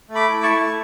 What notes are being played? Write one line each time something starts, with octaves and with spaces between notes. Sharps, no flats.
A3
B5 D6
E4
A5 C#6
A3